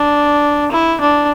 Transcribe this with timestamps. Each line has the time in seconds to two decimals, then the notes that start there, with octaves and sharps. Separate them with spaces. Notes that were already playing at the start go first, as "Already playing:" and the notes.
Already playing: D4
0.72 E4
1.01 D4